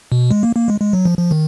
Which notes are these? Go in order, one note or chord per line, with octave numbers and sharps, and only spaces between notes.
B2
G#3
A#3
A#3
G#3
G#3
F#3
F3
F3
D#3